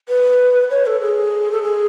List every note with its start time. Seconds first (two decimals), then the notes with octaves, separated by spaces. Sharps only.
0.09 B4
0.70 C#5
0.86 A4
1.01 G#4
1.51 A4
1.62 G#4